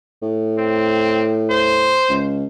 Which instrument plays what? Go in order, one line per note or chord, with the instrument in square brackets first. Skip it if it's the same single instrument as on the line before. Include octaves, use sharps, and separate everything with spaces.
[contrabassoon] A2
[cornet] C4
C5
[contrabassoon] C#2